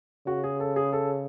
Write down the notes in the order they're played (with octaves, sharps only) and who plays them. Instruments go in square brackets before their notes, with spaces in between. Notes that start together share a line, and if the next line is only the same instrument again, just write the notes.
[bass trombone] C#3 [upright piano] F#4
[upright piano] G#4
A4
G#4
A4